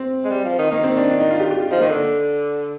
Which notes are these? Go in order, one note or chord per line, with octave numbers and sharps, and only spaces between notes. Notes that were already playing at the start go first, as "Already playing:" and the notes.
Already playing: C4
G#3
G3
F3
D#3
D#3 A#3
C4
D4
D4
D#4
F4
G4
G4
F4
F3 D#4
D#3 A#3
D3